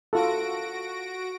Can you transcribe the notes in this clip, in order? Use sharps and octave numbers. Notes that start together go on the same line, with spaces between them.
F4 F#4 A4 A#6 D7